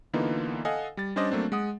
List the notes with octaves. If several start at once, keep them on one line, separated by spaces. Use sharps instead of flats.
D3 E3 A#3 B3 D#4 F4
A4 D#5 F5 F#5 G#5
G3 A6
G3 C#4 D4 C5 D5 D#5
F#3 A3 A#3 C4 D4
G#3 F#5 D#6